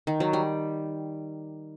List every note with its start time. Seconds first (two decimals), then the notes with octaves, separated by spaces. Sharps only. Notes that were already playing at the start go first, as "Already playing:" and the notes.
0.07 D#3
0.20 F#3
0.33 G3